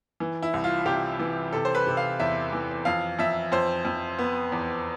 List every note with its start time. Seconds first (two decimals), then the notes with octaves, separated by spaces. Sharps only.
0.20 E3
0.42 E4
0.54 C2
0.64 F4
0.86 C3 G4
1.20 E3
1.53 C3 A4
1.65 C5
1.75 B4
1.87 C3
1.97 F5
2.20 E2 E5
2.53 E3
2.85 F2 F5
3.19 F2 E5
3.52 F2 C5
3.85 F2
4.19 B3
4.52 E2